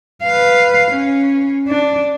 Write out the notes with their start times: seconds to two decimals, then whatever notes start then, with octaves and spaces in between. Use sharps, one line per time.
0.23 B4 F5
0.92 C#4
1.68 D4